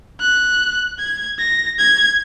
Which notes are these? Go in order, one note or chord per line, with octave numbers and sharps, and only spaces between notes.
F#6
G#6
A#6
G#6